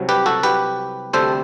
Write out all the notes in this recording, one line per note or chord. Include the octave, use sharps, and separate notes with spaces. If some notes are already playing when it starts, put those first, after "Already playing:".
Already playing: C2 C3 F#3
G4 B4
F#4 A4
G4 B4
D2 C3 G3 A4 C5